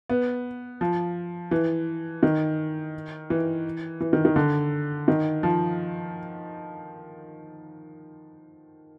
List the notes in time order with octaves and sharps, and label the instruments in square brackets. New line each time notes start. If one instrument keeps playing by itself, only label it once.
[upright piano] B3
F3
E3
D#3
E3
E3
D#3
D#3
D3
D#3
F3